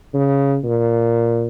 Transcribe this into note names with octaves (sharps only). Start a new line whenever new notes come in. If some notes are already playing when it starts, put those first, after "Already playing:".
C#3
A#2